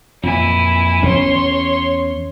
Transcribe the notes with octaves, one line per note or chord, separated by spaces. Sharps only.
F2 A#2 E3 E4 G#5
E2 C#4 C#5 C6